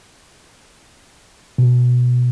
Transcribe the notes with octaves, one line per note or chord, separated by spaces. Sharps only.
B2